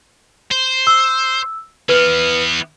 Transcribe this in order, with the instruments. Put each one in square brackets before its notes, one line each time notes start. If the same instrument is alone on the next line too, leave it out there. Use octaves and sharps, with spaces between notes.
[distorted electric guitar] C5
[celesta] E6
[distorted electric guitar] E3 B3 [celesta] B4 F6